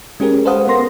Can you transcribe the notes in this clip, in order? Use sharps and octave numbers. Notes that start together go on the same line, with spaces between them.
G#3 C#4 G4 G#4 A#4
A4 B4 C5 F5 F#5 D#6
B3 A#4 C6 A#6